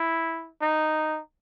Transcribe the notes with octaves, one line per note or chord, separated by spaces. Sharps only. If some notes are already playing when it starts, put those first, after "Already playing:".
Already playing: E4
D#4